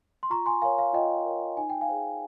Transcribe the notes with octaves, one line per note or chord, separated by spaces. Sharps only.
C6
F4 A#5 C#6
G#5 C6
A#4 C#5 F5 G#5
F5
F4 D#5 G5
A#4 C#5
D#4 G#5
G5
F5 G#5
G#4 C5